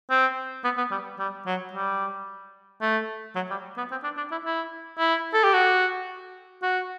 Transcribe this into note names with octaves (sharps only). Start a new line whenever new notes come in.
C4
B3
B3
G3
G3
F#3
G3
A3
F#3
G3
B3
C4
D4
D4
E4
E4
E4
A4
G4
F#4
F#4